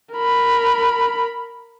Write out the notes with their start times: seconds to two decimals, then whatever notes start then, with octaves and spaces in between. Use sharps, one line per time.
0.14 A#4 B5